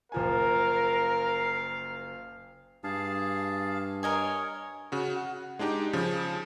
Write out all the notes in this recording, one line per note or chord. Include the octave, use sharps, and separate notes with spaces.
F#1 F3 A#4 F5 G#5
G2 G#4 F5 A5
A#4 C#5 D#5 G#5
C#3 F#4
F#5
G#3 D4 D#4 G4
C#3 F3